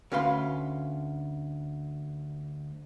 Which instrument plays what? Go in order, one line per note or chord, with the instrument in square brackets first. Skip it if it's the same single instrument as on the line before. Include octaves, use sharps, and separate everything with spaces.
[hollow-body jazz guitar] D2 C#4 B4 F5 C6